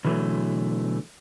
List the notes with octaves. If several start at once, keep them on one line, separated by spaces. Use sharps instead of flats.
B2 D3 E3 F#3 A3